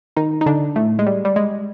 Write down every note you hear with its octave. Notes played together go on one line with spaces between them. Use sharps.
D#3 D#4
D#4
D3 D4
A2 A3
G#3
G3
G3
G#3